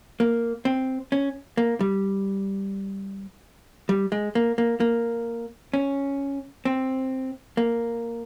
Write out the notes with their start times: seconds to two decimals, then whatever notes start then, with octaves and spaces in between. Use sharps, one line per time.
0.20 A#3
0.65 C4
1.12 C#4
1.57 A#3
1.81 G3
3.89 G3
4.12 G#3
4.35 A#3
4.58 A#3
4.80 A#3
5.74 C#4
6.65 C4
7.57 A#3